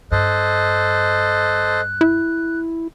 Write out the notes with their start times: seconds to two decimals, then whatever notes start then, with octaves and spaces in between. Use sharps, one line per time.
0.12 G2 A4 C5 D#5 F#6
2.01 E4